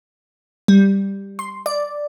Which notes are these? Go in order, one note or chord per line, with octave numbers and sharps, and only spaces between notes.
G3
C6
D5